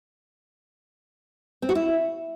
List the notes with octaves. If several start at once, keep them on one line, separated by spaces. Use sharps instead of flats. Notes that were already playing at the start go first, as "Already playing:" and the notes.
C4
F#4
E4